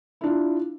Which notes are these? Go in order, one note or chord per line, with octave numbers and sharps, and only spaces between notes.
D4 E4 F4